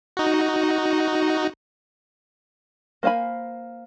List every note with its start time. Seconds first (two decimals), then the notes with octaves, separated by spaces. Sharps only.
0.17 D#4 F#4
3.03 A#3 C5 F5 G#5 B5